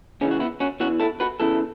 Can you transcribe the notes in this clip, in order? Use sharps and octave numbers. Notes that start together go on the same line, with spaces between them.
C#2 C#3 E3 C#4
F#4
B3 E4
C#4 F#4
E2 E3 C#4 F#4
E4 A4
F#4 B4
E2 C#3 E3 E4 A4